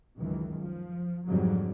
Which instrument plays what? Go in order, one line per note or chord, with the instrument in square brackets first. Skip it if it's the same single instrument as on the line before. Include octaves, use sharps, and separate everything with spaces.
[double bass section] C#2 F#2 D#3 E3
F3
F2 G#2 D3 F#3 G3